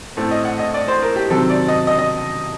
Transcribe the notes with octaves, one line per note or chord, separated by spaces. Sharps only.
A2 A3 C4
D#5
F#5
D#5
D5
C5
A#4
G4
C3 D#3 F#3 C4 A4
D5
D#5
D#5
D#5